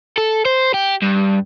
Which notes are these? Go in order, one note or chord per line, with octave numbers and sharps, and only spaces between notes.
A4
C5
G4
G2